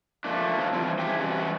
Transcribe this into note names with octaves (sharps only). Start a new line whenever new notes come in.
F3 A3 A#3 D4
D#3 F#3 F4
E3 F3 G3 C4
C#4 G4 G#4 C5 E5 G5
E3 F#3 G3 C#4 F#4